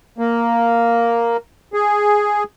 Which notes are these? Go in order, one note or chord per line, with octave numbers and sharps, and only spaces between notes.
A#3
G#4